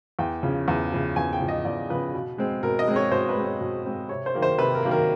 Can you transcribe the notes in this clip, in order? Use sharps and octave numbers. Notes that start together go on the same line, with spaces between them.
E2 G5
C#3 F3
E2
C#3 F3
E2 G#5
G5
C#3 F3
D#5
E2 D5
C#3 F3 B4
B2
G#3 C4
B2 A#4
D#5
G#3 C4
C#5
B2 C5
B4
G#3 C4
C#5
B2
G#3 C4
C3 C#5
C5
D#3 F#3 A#3
C5
C3 B4
A#4
D#3 F#3 A#3
A#4